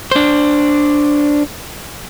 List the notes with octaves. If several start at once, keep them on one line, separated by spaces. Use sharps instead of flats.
D4 C5